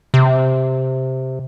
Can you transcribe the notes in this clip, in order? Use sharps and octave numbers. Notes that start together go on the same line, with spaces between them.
C3